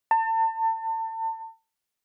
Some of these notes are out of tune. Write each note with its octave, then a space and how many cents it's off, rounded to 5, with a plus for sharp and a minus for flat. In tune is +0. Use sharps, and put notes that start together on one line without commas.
A5 +35